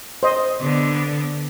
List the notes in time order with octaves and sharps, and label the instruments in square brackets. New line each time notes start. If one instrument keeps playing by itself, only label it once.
[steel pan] C5 D#5
[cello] D3 B3